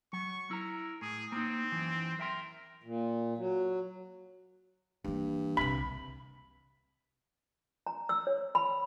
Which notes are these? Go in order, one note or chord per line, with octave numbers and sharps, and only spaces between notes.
F#3 C#6
E4 A#4 A#5
A2 G#4
A#3 C4 D#4
F#2 E3
A#4 E5 G5 C6
A#2
F#3
G2 E3 A#3
C2 C3 B5
A#5
E6
C#5
B5